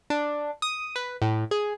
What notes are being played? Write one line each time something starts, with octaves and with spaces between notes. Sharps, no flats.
D4
D#6
B4
A2
G#4